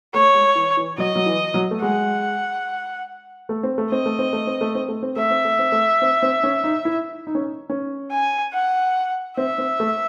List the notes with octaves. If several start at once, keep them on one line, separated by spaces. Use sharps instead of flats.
A3 C#5
G#3
E3
E3
F#3 D#5
F#3
E3
F#3
A3
G#3 F#5
A3
C4
A3
C4 D#5
A3
C4
A3
C4
A3
C4
A3
C4
A3 E5
C4
A3
C4
A3
C4
C4
C#4
D#4
E4
D#4
C#4
D#4
C#4
G#5
F#5
C4 E5
C4
A3